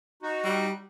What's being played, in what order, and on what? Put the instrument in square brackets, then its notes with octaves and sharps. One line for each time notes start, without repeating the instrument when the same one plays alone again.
[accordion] D#4 F#4
[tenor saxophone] G3